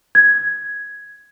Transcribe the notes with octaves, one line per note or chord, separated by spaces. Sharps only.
G#6